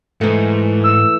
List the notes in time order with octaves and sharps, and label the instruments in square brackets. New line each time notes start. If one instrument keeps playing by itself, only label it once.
[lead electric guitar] G#2 [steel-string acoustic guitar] E3 A3
[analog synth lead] E6